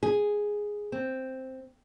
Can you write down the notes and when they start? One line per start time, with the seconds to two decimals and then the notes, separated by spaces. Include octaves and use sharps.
0.03 G#4
0.92 C4